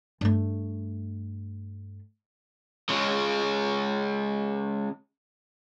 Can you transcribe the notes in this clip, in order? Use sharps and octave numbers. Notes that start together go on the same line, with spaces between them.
G2 A3
C#3 G#3